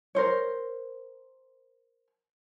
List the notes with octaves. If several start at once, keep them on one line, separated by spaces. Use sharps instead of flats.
A#4 C5 C#5